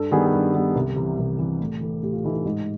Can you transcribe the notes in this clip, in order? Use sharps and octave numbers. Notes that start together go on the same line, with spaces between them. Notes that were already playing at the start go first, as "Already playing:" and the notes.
Already playing: G2 A4
D#3 G3 B3 G#4
G#4
G2 G4
D#3 G3 B3
C2
C3 E3
C2
C3 E3
A2
E3 A3
A2 G4
F4
E3 A3 D#4
D#4
G#2 D#4